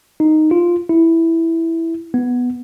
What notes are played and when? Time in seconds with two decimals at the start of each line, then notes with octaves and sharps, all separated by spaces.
0.20 D#4
0.51 F4
0.89 E4
2.14 B3